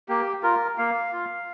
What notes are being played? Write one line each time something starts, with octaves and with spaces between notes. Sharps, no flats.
A#3 G4
F4 A#4
A#3 F5
F4